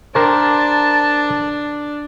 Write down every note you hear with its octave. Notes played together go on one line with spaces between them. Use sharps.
D4 G4 A#4 C5 A5